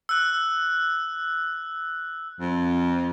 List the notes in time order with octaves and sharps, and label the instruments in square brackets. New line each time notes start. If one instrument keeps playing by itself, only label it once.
[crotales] E6 F#6
[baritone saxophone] F2